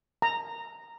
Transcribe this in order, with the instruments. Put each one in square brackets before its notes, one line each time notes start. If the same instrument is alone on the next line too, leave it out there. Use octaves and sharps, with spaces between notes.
[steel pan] A#5